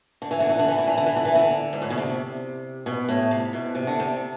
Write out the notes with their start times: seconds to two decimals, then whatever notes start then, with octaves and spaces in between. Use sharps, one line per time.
0.22 D3
0.31 E3
0.40 D3
0.49 E3
0.59 D3
0.68 E3
0.79 D3
0.87 E3
0.98 D3
1.07 E3
1.17 D3
1.25 E3
1.36 D3
1.73 G#2
1.82 A2
1.90 B2
1.98 C3
2.86 B2
3.09 A2
3.31 C3
3.53 B2
3.75 C3
3.87 D3
4.00 C3